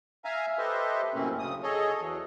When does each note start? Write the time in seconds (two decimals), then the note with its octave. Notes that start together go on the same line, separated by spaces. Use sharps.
0.25 E5 F5 G#5 A#5
0.58 G4 A4 B4 C5 D#5 E5
1.14 F#2 A2 C3 A#3 C4 C#4
1.39 D2 C#3 D#6
1.63 G#4 A4 C#5 D#5
2.01 E2 E3 F#3